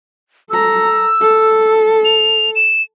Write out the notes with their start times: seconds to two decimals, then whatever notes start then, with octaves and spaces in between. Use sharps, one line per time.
0.50 A4 A#5 E6
1.21 A4
2.05 F7
2.55 E7